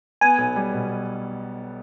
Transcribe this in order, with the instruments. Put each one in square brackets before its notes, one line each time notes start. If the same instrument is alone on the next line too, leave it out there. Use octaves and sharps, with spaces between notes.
[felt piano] B3 [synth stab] G#5
[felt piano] B1
G3
B2